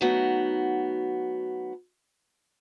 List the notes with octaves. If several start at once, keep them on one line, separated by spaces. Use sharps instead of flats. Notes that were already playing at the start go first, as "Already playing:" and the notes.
F#3 A3 B3 D#4 F#4